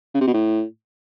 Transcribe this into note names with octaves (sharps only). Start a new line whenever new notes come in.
C#3
C3
B2
A2